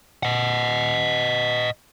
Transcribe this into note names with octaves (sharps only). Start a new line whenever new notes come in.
D#5 F#5